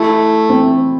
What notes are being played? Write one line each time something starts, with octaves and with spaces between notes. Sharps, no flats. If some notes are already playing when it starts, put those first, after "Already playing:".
Already playing: A3 E4
C4